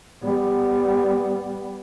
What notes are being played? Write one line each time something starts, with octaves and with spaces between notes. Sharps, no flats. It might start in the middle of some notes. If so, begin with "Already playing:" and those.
G3 B3